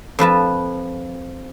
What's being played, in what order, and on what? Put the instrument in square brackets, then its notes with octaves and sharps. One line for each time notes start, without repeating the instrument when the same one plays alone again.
[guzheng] F2 F3 B4 A5